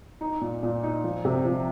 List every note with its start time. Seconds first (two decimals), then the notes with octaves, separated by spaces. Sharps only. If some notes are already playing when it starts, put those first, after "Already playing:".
0.21 D#4
0.41 A#2
0.63 A#2
0.83 D#4
1.04 F3
1.25 C3
1.45 F3